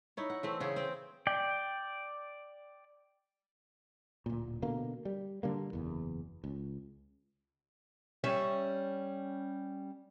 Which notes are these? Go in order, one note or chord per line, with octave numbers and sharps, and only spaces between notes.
D#4 E4 C#5
F#5
E3 A3 C4
C#3 G#4 F#5 G5
C4 G5
D5 G5
D1 A#2
B2 D3 A#3
G3
D3 G3 A#3
F#1 E2
C#2
G3 C#4 E5